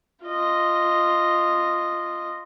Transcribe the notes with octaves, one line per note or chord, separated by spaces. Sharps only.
F4 D#5